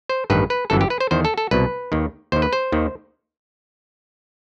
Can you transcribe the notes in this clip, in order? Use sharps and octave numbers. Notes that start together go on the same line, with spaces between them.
C5
A1 G2 D#3 B4
B4
G1 F#2 E3 A4
G4
B4
C5
E2 D#3 C5
A4
A4
C2 B2 B4
D#2 D#3
D#2 D#3 C5
B4
C5
D#2 D#3